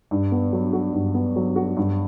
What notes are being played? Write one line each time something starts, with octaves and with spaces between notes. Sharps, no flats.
G2
B3
F#3
F#4
G2
B3
F#3
F#4
G2